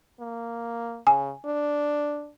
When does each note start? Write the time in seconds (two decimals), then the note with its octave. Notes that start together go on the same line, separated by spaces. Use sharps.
0.20 A#3
1.07 C#3 G#5
1.45 D4